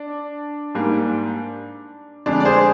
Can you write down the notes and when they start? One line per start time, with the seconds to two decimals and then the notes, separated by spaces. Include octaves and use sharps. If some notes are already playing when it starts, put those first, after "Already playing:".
Already playing: D4
0.75 G#2 G3 A#3
2.26 F2 D3 G#3 D4
2.40 D5
2.45 G#4 C5